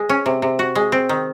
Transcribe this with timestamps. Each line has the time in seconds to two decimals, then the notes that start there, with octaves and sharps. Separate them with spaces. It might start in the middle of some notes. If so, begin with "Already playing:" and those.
Already playing: G#3
0.09 C#4
0.26 C3
0.42 C3
0.59 F#4
0.75 G#3
0.92 C4
1.09 D#3